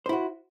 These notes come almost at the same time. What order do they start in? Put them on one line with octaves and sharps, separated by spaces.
C5 E4 F#4